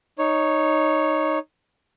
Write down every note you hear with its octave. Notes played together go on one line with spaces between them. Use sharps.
D#4 C#5